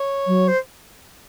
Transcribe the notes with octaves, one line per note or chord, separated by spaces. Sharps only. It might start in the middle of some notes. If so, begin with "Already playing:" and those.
Already playing: C#5
F#3
C5